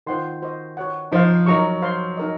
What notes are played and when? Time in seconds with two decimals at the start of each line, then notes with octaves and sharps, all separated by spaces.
0.06 D#3 F4 C5 F#5 C6
0.42 F#4 C5 D#5
0.77 F#4 C#5 F#5
1.12 F3 D#4 F#4 C5 F5
1.46 F#3 D#4 A#4 F5 A#5 C#6
1.82 C5 F5 C6
2.17 D#4 A#4 D#5